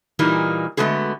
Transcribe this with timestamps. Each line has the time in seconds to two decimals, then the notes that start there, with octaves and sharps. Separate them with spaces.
0.19 A#2 E3 G3 A#3 D#4
0.77 D3 G#3 A3 B3 F#4 G#4